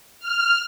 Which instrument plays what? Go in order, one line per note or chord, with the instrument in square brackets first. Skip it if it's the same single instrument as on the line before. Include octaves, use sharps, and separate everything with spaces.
[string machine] F6